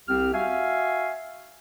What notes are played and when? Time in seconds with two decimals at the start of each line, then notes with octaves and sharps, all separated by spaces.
0.07 C2 C4 G4 F6
0.34 F#4 E5 F5 G#5